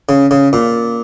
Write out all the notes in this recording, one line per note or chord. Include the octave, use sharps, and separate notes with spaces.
C#3
C#3
A#2